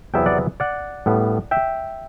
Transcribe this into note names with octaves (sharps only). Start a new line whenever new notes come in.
E2 C3 F#3 B3 E4 E5 G5
D5 F#5
D5 F#5
A2 G3 B3 D4
E5 G5